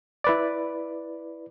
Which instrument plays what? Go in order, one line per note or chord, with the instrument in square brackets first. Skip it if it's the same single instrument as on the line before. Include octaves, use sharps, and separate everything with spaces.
[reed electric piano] E4 B4 D5